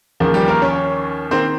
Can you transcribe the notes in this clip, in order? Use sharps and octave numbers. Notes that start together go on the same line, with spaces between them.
D#2 C#3 F3 A#3
G3 G4
A#3 A#4
C#4 C#5
D#3 A#3 C4 C5